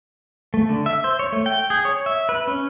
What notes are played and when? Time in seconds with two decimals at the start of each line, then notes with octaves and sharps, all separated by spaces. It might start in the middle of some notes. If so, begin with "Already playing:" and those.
0.54 A3
0.69 D3
0.86 E5
1.04 C5
1.19 C#5
1.32 A3
1.46 G5
1.70 G#4
1.85 C#5
2.06 E5
2.29 B4
2.47 C#4